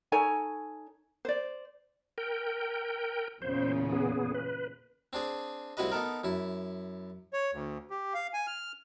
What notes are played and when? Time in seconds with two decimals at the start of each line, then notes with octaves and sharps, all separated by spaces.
0.12 D#4 A4 C#5 G#5
1.25 C5 D5
2.18 A#4 G5
3.42 E2 A#2 C#3 C5
3.92 B3 G#4
4.34 B4
5.13 C4 D4 G#4
5.77 C2 C4 E4 F#4 B4 D#5
5.92 B3 D#4 A4 A#4
6.24 F#2 E4
7.33 C#5
7.52 D2
7.90 G4
8.14 F5
8.34 G#5
8.47 F6